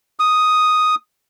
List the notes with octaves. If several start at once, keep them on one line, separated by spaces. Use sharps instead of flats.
D#6